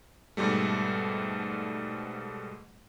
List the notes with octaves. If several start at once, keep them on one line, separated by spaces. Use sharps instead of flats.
G#2 B2 G3 A3